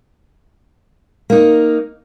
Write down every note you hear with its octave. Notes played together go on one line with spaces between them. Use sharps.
A#3 D#4